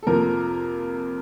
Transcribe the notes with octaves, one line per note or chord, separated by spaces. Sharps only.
A4
F2 C3 F3 A#3 A#4